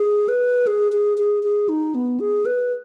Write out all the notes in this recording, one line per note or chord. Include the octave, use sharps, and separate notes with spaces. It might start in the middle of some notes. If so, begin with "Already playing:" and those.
Already playing: G#4
B4
G#4
G#4
G#4
G#4
D#4
B3
G#4
B4